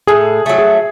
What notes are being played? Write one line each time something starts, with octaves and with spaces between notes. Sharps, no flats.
A2 G#4
F#3 A3
G#4